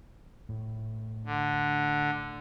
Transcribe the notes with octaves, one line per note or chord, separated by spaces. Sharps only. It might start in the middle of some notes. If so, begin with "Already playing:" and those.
A2
D3